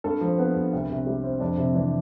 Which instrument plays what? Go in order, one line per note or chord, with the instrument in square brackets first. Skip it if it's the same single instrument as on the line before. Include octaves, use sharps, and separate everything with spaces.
[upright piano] G2 A4
F3
B3 B4
G2
C2
C3
G3
C4
F2 D4
C3
E3 D4